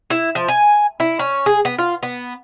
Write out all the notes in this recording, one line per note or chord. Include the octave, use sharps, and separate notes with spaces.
E4
F3
G#5
E4
C#4
G#4
B3
F4
B3